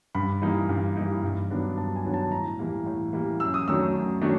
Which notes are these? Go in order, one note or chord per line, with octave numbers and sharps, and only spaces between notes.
G2 B5
E3 G3 A#3 D#4
G2
E3 G3 A#3 D#4
G2
D#3 F#3 B3 D4
G2 A5
G#5
D#3 F#3 B3 D4
A5
A2 A#5
E3 G3 A#3
A2
E3 G3 A#3
F#2 E6
D#6
D#3 F#3 A3 D4 E6
F#2
D#3 F#3 A3 D4